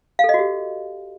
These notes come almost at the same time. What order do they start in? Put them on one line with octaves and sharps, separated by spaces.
F5 A4 D#5 F#4 G4